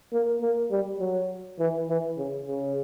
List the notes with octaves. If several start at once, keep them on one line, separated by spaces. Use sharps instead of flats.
A#3
A#3
G3
F#3
E3
E3
C#3
C#3